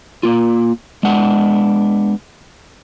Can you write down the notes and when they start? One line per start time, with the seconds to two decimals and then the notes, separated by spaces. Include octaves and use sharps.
0.23 A#3 F4
1.03 G#3 B3 D4 F#5